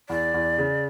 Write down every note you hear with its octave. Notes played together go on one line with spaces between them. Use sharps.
E2 D5
E2
C#3